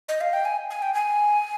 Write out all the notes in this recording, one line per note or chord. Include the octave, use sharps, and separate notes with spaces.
D#5
F5
G5
G#5
G#5
G5
G#5